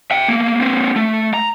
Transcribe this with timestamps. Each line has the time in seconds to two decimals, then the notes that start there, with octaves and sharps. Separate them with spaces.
0.11 E5 G5
0.28 A3 A#3
0.60 A#3 C4
0.96 A3
1.34 A#5